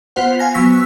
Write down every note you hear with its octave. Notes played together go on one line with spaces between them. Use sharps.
B3 F4 C5 F#5
F5 G#5 A#6
F#3 B3 C#6 E6 B6